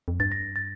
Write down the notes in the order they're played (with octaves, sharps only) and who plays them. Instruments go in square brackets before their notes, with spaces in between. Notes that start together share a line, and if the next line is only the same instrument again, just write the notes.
[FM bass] F2
[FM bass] G2 [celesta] A6
[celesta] A#6
A6